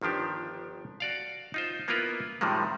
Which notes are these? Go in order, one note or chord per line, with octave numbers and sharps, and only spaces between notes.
G1 D#3 F3 D4 G4
F#4 D5 F5
D#4 F4 C5
A#3 B3 E4 F4 A#4 B4
A2 C3 D#3 F3 G3 G#3